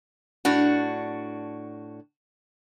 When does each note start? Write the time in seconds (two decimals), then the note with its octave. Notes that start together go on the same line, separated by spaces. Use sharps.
0.45 A2 D4 F#4